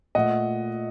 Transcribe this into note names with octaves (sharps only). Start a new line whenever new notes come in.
A#2 A3 D#5 F#5